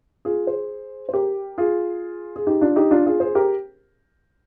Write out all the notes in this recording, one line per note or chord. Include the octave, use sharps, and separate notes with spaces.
F4 G#4
G#4 C5
C5
G4 A#4
F4 G#4
G#4
D#4 G4
D4 F4
D#4 G4
D4 F4
F4 G#4
G#4 C5
G4 A#4